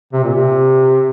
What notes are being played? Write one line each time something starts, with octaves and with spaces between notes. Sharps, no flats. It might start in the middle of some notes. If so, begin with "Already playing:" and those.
C3
A#2
C3